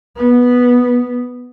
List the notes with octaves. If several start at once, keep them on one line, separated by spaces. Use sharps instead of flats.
B3